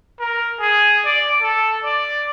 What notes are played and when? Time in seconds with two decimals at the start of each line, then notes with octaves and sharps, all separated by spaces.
0.19 A#4
0.60 G#4
1.05 D5
1.42 A4
1.84 D5